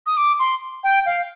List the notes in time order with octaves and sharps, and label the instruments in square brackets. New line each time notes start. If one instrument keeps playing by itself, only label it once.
[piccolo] D#6
D6
C6
G5
F5